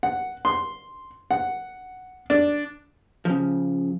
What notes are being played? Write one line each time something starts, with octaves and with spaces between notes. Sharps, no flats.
F#5
C6
F#5
D4
C#3 F3